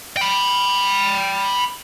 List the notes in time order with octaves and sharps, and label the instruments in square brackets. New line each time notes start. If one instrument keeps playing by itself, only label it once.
[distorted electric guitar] G5 B5